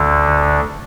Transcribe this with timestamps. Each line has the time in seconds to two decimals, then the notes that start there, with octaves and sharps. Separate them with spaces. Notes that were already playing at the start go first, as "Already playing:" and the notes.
Already playing: D2 D3